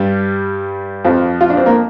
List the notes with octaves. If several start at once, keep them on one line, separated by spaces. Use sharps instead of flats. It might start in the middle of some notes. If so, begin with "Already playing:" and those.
Already playing: G2 G3
F2 F3
F4
D4
C4
A#3